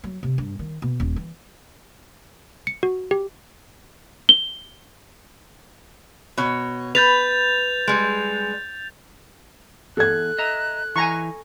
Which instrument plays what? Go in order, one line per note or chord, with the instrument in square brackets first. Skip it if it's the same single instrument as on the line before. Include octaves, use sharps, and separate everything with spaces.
[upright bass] F#3
C3
G2
D#3
B2
D#1
E3
[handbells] C#7
F#4
G4
[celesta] G7
[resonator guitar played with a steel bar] B2 C#5
[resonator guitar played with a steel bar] B4 [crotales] G6 A6 F7
[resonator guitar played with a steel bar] G3 G#3
[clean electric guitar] E2 [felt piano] A4 G#6 [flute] F#6
[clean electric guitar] D#5 E5 A#5
[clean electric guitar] E3 [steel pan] G#5 A#5 C#6